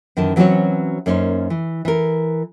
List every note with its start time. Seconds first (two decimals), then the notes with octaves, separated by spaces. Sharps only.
0.17 F#2 D#3 E3 A#4 A5
0.36 E3 F#3 C4 C#4 F#4 C#5
1.06 F#2 A#3 C#4 D#4 A4 C5
1.50 E3
1.85 E3 A#4